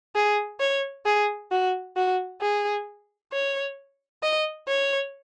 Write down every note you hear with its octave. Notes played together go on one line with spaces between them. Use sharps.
G#4
C#5
G#4
F#4
F#4
G#4
C#5
D#5
C#5